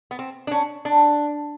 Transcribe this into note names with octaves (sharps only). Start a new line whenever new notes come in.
B3
C4
D4
C#4
D4